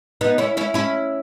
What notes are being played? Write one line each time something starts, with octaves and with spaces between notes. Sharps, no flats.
B3 D#4
C#4 E4
C#4 E4
C#4 E4